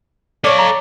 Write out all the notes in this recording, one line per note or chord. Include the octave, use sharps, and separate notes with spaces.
A4 C#5 D5 F5
A#5